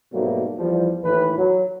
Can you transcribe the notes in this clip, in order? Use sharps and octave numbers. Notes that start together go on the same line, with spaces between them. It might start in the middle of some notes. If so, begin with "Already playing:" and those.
G#2 B2 F#3 G3 A3 A#3
E2 F3 G3
D#2 A2 E3 B4
F#3